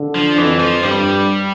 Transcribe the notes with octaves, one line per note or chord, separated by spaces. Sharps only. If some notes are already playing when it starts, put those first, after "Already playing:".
Already playing: D3
F3
F2 E3
F3
G2 G3